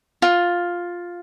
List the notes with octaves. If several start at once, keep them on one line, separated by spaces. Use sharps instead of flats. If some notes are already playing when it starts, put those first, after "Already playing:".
F4